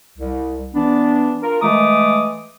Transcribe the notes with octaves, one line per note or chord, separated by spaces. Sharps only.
C2
E3 B3 D4
F4 A#4
E3 G#3 A3 D6 D#6